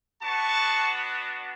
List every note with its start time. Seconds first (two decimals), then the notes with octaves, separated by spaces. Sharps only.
0.22 B3 D4 F#4 A5 C#6